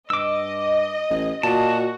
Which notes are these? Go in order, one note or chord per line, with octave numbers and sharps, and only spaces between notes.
G2 D#5 D6 E6
A1
A#2 F#4 A5